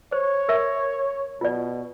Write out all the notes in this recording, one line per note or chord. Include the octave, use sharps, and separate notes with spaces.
C5 C#5
A#4 E5
B2 F4 D5